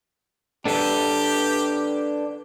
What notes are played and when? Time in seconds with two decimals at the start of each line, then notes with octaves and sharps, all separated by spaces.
0.65 D4 G4 A4 B4